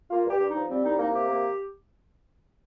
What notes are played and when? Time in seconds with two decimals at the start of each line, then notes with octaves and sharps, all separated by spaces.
0.10 A#3 F4
0.26 G2
0.30 G4
0.39 G2
0.49 D#4
0.55 F3
0.69 G3 C4
0.84 C2 D#4
0.98 A#3 D#4
1.13 C3 G4
1.28 A#3